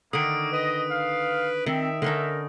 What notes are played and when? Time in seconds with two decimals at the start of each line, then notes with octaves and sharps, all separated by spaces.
0.13 D3 D#3 A3 A#3 D#6 D7
0.53 B4 D#5
0.91 F5
1.66 D#3 C4 E5
2.02 D3 C#4 D#4 A#4